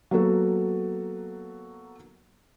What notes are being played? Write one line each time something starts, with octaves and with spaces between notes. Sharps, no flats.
F#3 A#3 B3 F#4 A4